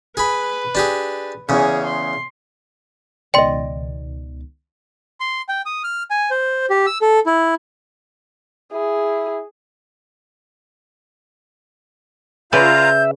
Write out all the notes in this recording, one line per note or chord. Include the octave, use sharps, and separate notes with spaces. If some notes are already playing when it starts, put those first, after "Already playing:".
G#4 B4 B5
D4 G4 G#4
E2 C#3 C#4 G#4
C6
C#2 B2 D#3 D5 D#5 G5 C6
C6
G5
D#6
F6
G#5
C5
G4
E6
A4
E4
E4 G#4
C#3 F4 B4 D5 E5 F5 A#5 G6